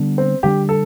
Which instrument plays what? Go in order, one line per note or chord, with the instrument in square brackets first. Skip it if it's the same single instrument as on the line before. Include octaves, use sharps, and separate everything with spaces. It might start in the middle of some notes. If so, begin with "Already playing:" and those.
Already playing: [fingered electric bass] D3 G3 B3 D4
[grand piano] C4
[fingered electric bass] D3 G3 B3 D4 [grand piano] G4
[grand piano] A4